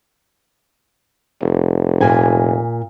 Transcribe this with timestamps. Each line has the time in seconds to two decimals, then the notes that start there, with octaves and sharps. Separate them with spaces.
1.41 F1
2.01 A#2 G#5